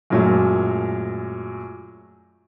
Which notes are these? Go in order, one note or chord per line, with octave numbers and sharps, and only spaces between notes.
F#2 A#2 F#3 G#3 A3